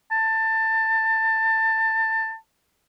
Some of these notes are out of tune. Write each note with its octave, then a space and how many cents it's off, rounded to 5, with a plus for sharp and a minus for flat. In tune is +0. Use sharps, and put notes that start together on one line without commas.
A5 +20